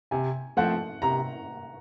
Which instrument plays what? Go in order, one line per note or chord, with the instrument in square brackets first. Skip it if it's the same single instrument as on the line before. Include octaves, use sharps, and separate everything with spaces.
[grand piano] C3 [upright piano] G#5
[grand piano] F3 A3 C4 [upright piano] F#5
[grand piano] C3 [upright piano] A#5